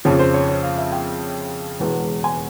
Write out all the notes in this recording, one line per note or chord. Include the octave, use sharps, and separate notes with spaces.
F2 C#3 F3 C#5
C5
C#5
C#5
F5
E5
G5
E1 E2 B2 G#3
G#5